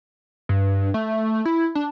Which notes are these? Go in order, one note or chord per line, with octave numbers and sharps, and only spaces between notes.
G2
A3
E4
D4